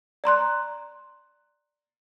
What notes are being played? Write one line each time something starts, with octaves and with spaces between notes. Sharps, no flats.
D5 A#5 C6 F#6